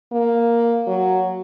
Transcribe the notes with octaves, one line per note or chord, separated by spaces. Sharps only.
A#3
F#3